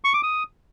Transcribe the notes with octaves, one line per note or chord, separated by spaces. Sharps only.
C#6
D6
D#6